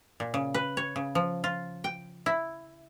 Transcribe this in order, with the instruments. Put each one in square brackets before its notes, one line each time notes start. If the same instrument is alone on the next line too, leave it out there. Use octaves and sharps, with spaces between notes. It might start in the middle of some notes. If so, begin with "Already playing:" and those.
[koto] A#2
C#3
B4
C#5
C#3
F3
F4
G5
E4